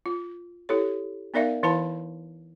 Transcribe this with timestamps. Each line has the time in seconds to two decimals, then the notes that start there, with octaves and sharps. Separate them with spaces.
0.06 F4
0.69 E4 G4 A4 C#5
1.34 B3 D#4 A#4 D5 E5 F5
1.63 E3 E4 B4 F5 A5 B5